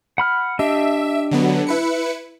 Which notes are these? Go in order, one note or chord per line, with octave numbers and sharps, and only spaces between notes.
F#5 B5 F6
D4 G4 D#5 E5
D3 F#3 B3
E4 B4 C#7